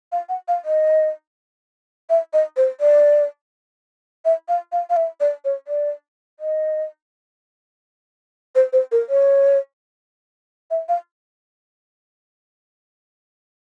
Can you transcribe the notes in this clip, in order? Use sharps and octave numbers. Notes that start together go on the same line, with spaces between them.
F5
F#5
F5
D#5
E5
D#5
C5
D5
E5
F5
F5
F5
E5
D5
C#5
D5
D#5
C5
C5
A#4
C#5
E5
F5